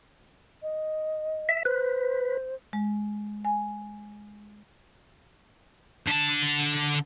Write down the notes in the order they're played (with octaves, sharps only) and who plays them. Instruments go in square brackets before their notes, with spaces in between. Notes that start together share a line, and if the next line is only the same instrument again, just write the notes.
[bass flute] D#5
[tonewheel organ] E5
[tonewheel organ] B4 [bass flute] C5
[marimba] G#3
G#5
[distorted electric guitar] D3 A5